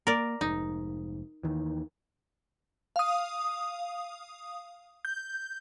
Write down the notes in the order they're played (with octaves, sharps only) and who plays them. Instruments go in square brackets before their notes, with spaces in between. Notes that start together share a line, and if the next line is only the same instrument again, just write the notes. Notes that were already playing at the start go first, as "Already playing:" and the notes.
[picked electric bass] A#3 [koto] A#4 D5
[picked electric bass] F1 G#2 [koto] D#4
[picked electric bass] D#2 D#3 E3
[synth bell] F5 D#6
G6